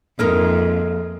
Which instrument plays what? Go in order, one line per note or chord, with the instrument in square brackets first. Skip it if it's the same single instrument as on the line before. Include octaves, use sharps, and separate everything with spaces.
[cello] F2 [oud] G#3 D#4 A#4 [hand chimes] A#3 A4 F6